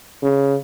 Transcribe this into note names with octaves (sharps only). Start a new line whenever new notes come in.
C#3